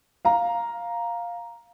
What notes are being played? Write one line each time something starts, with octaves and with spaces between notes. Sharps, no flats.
F5 A#5